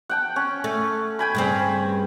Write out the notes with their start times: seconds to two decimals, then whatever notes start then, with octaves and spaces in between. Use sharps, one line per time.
0.09 F#5 G5 A5
0.36 C#4
0.64 A3
1.19 G5 G#5 B5
1.35 G2 C#3 C4